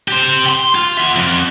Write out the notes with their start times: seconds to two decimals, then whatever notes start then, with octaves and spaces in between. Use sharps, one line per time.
0.08 G4 C5
0.49 C6
0.75 F4
0.97 E5 F#5
1.16 F2